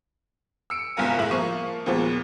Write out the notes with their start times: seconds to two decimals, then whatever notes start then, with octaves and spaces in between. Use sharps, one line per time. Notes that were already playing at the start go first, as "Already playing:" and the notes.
0.70 E6 C#7 D7
0.97 G1 C2 G#2 F4 A#4 G#5
1.19 A2 G#3 A#4 E5 F#7
1.31 F3 A#3 C#6 D#7
1.86 D#2 A#2 F3 G#3 B3